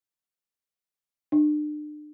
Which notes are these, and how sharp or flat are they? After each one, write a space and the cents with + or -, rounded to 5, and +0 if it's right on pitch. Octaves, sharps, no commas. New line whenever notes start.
D4 +35